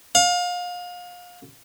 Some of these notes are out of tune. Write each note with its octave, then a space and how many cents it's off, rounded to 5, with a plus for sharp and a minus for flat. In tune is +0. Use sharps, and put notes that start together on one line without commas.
F5 +30